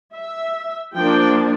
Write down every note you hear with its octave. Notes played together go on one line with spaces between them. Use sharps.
E5
F3 A#3 D4 G5